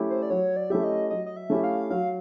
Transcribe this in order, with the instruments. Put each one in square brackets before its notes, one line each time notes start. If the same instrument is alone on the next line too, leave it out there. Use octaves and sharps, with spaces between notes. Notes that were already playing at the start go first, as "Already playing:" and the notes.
Already playing: [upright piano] A3 C#4 E4 G4
[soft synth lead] C5
D5
[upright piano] F#3 [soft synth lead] C#5
[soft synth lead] D5
[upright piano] A3 C#4 E4 G4 [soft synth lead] E5
[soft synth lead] D#5
[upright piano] F#3 [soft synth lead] D#5
[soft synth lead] D#5
E5
[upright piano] A3 C#4 E4 G4
[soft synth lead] F5
[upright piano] F#3 [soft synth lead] F5